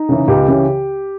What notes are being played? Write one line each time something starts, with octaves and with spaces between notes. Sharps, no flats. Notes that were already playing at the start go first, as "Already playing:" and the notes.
Already playing: D#4
C#3 E3
C#2 G4
C#3 E3